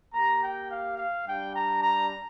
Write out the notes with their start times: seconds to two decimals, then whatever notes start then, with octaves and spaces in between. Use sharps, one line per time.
0.14 A#3 G4 A#5
0.43 G5
0.70 F5
0.98 F5
1.26 G3 D4 G4 G5
1.54 A#5
1.83 A#5